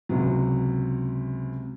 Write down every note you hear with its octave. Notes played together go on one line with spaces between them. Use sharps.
C#2 C3 F#3